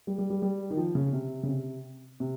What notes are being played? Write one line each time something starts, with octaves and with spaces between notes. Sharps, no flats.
G3
G3
G3
G3
D#3
F3
C#3
C3
C#3
C3
C3